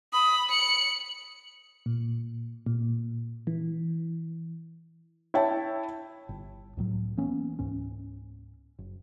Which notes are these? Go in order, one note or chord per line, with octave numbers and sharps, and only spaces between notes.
B5 D#6
C#7 F#7
A#2
A#2
E3
E4 C#5 G5 A5
G1
C#2 A2 F#3
E3 A#3 B3 C#4
C#2 G#2 C#4
F#1